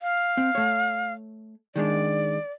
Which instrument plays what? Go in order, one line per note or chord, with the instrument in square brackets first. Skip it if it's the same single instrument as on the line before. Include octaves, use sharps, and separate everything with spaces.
[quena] F5
[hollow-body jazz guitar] C4
A3 C#5
[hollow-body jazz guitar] D#3 G#3 D4 [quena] D5